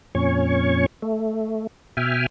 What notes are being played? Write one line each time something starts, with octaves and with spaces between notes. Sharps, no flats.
F2 A#2 C#4 C#5 C#6
A3
B2 E5 G5 G#5 F6